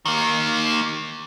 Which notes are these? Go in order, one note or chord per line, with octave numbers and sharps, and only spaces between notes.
D#3 A#3